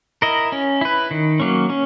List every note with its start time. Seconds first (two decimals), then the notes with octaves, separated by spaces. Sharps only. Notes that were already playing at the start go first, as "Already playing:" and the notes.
0.22 E4 A#4 D#5
0.52 C#4
0.81 E4 B4
1.11 D#3
1.40 F#3 A#3 C#4
1.70 C#4